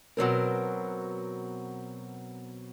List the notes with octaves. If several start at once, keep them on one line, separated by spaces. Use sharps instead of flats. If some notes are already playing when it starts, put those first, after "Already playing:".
B2 F#3 C4 A#4